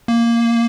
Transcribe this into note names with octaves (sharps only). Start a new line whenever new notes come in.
A#3